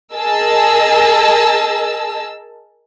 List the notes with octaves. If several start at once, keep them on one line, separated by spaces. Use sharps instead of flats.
G#4 A#4 D#5 A5 E6